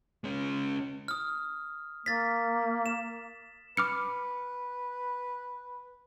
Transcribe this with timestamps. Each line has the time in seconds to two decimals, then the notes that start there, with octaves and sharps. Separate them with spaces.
0.24 G#3 C#4
1.08 D#6 F6
2.06 A#3 A6 B6
2.86 E7
3.77 B4 D6 F6 C#7